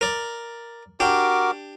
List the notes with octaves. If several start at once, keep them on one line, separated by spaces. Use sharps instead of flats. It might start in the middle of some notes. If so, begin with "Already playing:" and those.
A#4 D5
D4 F#4 G4 A#4 D6